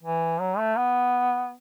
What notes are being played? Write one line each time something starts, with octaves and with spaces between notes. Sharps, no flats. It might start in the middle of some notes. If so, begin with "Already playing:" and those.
E3
F#3
A3
B3